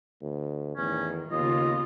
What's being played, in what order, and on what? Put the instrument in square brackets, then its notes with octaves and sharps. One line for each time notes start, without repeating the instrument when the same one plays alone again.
[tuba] D2
[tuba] E2 [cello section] A2 D#3 [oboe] C#4
[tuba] D#2 [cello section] C#3 B3 F4 [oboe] D#5